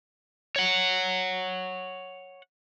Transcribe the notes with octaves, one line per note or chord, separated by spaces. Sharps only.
C#5 F#5